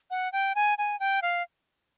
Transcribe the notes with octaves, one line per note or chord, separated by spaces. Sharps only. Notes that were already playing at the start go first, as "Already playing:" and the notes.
F#5
G5
G#5
G#5
G5
F5